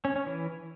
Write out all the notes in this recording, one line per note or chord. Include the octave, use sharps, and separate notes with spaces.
C#4
C#4
E3